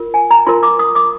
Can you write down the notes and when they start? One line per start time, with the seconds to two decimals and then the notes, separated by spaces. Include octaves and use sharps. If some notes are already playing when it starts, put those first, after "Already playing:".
Already playing: F4 A#4
0.14 G#5
0.31 A#5
0.47 F4 A#4 C6
0.63 D6
0.79 D#6
0.95 D6